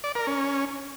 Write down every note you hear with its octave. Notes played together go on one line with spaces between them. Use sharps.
D5
A#4
C#4